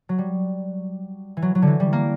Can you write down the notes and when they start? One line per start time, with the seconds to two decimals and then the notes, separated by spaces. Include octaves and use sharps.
0.09 F#3
0.18 G3
1.37 E3
1.42 F#3
1.55 F#3
1.62 D3 E3
1.80 G3
1.93 A#3